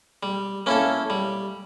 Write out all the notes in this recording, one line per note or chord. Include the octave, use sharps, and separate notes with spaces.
G3
A#3 C#4 E4 A4
G3